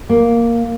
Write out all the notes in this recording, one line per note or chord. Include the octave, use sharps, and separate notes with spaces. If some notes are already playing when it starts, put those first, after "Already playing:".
A#3